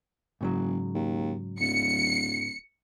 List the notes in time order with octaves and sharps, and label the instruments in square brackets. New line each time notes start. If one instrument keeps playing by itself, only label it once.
[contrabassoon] F#1 [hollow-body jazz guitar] G#2 C#3 F#3
[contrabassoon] D#2
[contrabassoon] D1 [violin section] C#7